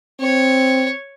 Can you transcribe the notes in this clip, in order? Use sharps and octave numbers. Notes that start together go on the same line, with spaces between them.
C4 C#5